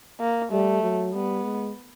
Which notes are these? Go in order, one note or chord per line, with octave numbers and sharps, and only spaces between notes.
A#3
G3 A3
F#3
G3 B3
G#3